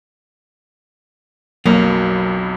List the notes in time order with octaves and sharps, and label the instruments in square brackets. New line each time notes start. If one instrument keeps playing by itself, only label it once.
[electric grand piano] B1 F2 [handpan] F#3 [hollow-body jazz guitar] A#3